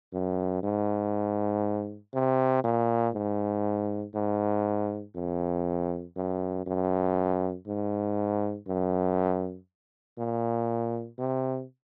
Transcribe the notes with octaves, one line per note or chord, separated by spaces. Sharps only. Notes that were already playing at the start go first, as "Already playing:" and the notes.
F#2
G#2
C3
A#2
G#2
G#2
F2
F#2
F#2
G#2
F#2
A#2
C3